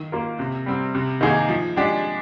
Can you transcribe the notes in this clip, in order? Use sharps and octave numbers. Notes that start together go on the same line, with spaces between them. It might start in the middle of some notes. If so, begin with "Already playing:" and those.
Already playing: D#3
A#3 F4 A#4
C3
G3 C4
C3
D#3 A#3 D#4 G#4
F3
G#3 D4 G4